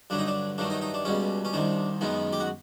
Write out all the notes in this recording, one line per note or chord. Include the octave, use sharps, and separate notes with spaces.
G2 D3 F#3 D4
D#4
D4
G2 D#3 F#3 A3 D4
D#4
D#4
D4
C#2 B2 G3 C#4
C#4
C2 C3 D#3 D4
F#2 D#3 G#3 B3
G4
F#4